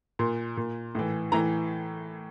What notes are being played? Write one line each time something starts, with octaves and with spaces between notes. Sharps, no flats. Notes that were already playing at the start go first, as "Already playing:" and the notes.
A#2 C6
A#2
A2 E3
A2 E3 A#5